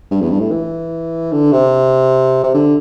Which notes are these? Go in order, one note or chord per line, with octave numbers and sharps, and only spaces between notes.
G2
E2
G2
A2
E3
D3
C3
C3
D3